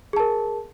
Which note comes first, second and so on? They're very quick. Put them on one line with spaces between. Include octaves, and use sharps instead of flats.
G#4 A5 A#4